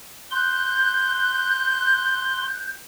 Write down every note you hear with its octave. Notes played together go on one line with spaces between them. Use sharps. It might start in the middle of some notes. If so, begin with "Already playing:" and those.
C6 F#6 G6